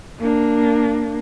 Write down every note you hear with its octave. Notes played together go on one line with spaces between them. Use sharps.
A#3 D4